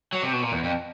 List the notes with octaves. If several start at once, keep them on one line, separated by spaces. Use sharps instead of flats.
F#3
C3
B2
A#2
E2
F2